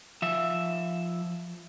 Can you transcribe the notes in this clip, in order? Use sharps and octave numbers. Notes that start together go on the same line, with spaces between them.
F3 E5